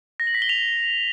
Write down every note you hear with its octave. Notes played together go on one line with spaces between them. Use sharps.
A#6
F#7
B6
G7
F7